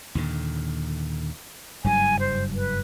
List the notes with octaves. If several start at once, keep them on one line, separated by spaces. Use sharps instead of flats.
D#2 A#2 D3
F#1 G2 F#3 G#5
C5
B4